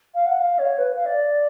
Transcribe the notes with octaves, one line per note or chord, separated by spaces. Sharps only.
F5
F#5
F5
C#5
B4
F5
D5